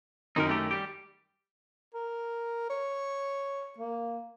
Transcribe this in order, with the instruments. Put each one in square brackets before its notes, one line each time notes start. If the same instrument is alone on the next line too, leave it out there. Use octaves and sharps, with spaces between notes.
[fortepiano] F#2 D#3 [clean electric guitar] D#4 F#4 A#4
[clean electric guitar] A3 G4
G3 G4
[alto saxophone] A#4
C#5
A#3